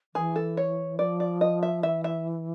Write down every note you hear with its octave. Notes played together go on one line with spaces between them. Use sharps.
E3 G#4
A4
C#5
F3 D5
D5
D#5
E5
E3 E5
E5